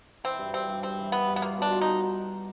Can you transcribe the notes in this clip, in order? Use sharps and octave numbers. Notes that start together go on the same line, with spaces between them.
E3 C4
G2
G2 C4
G2
G2 C4
E3
E3 B3
G2
B3
A#3 F4
B2 D4
F4
D#4